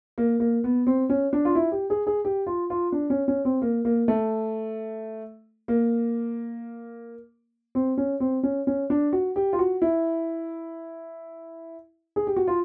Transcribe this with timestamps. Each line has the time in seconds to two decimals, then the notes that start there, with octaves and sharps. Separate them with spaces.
0.18 A#3
0.40 A#3
0.64 B3
0.87 C4
1.09 C#4
1.33 D4
1.45 F4
1.55 E4
1.72 G4
1.90 G#4
2.07 G#4
2.25 G4
2.47 F4
2.70 F4
2.92 D4
3.10 C#4
3.28 C#4
3.45 C4
3.62 A#3
3.85 A#3
4.08 A3
5.68 A#3
7.75 C4
7.98 C#4
8.20 C4
8.43 C#4
8.67 C#4
8.90 D4
9.13 F#4
9.36 G4
9.53 F4
9.59 F#4
9.82 E4
12.16 G#4
12.27 G4
12.36 F#4
12.48 F4